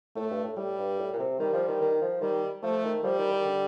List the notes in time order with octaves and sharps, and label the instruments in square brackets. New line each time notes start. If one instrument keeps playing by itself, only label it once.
[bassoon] A2 [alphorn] A3
[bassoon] G2
A2
[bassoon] A2 [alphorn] G3
[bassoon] G2
A2
A#2
C3
[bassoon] D#3 [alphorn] G3
[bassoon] F3
D#3
D#3
F3
[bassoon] D#3 [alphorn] G3
[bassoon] F3 [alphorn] A3
[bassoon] D#3
[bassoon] F3 [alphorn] G3
[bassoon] D#3
D#3
D3